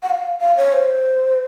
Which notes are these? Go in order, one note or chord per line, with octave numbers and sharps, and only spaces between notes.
F#5
F5
F5
C#5
C5